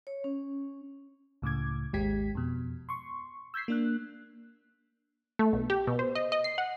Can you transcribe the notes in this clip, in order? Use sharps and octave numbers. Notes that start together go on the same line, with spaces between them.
C#5
C#4
C#2 A2 C#3 D6 G#6
G#1 D#2 G#3 G4 G#6 B6
F2 B2
C6 C#6
E6 G6 G#6 B6 C7
A#3 D4 F#6
A3
B1
G4
B2
C5
D#5
D#5
C7
F#5